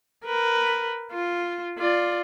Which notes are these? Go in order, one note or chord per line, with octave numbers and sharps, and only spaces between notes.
A#4 B4
F4
F4 D5